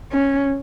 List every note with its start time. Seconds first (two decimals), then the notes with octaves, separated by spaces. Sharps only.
0.13 C#4